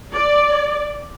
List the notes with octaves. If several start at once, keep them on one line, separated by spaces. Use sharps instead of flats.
D5